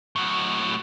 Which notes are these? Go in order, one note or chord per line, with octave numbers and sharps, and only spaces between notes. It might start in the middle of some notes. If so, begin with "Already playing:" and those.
A2 F#3